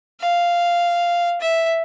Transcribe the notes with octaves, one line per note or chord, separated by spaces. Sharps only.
F5
E5